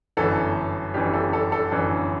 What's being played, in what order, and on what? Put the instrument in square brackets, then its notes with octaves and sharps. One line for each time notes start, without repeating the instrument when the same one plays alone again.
[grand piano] G1 F#2 E3 A4
G1 F#2 E3 G4
A4
A4
A4
G1 F#2 E3